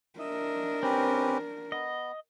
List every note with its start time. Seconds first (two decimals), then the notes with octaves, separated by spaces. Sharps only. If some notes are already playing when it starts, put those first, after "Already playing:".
0.19 D4 A#4 D#5 E5
0.83 C4 C#4 G4 B4
1.72 B3 D#5